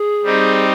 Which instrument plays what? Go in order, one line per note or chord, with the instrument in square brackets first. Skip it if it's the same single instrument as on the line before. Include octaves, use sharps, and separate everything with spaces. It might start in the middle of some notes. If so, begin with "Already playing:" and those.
Already playing: [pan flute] G#4
[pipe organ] G3 C4 D#4 G4